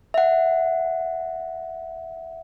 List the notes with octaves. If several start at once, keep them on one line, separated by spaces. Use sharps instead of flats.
E5 F#5